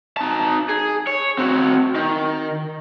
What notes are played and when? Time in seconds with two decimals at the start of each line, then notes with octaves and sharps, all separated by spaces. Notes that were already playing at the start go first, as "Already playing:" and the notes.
0.17 D#4 A5
0.69 G#4
1.07 C#5
1.38 C4 F#4
1.95 D#3